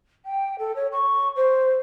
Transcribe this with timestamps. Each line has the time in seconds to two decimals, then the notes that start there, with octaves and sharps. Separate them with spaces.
0.25 G5
0.59 A4
0.76 C#5
0.92 C#6
1.36 C5